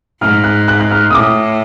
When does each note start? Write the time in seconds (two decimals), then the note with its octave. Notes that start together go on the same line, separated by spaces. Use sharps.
0.21 G#2 F6
0.44 F#6
0.68 F#6
0.80 F#6
0.92 F6
1.10 D#6
1.14 A2 D6